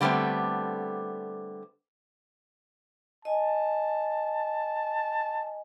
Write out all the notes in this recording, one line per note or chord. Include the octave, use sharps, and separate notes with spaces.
D3 G3 A3 B3 C4
D#5 G#5 A5